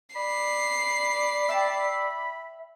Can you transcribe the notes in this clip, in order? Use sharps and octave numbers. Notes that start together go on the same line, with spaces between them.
D5 B5 C7
E5 G5 A5